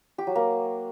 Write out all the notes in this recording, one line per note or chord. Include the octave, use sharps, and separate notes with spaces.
G4
F#3
A#3